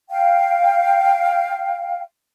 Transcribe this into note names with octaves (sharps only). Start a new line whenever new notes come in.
F5 G5